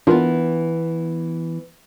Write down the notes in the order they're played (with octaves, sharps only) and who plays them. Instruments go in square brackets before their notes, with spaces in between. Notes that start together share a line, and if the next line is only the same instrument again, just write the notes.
[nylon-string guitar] E3 B3 [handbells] D4 F4 A#4